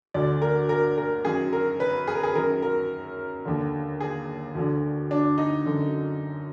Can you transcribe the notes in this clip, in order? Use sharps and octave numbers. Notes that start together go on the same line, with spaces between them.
D2 D3 D5
A#4
A#4
A#4
F#2 D#3 G#4
A#4
B4
G#4
A#4
G#4
F#2 D#3 A#4
A#4
D#2 D3
G#4
D2 D3
D4
D#4
F#2 D3